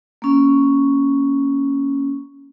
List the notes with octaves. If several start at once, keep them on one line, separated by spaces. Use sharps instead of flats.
A#3 C#4